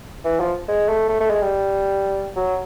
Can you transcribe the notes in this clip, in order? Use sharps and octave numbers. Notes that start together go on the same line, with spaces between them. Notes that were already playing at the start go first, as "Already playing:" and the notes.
E3
F3
G#3
A3
A3
A3
G#3
G3
F#3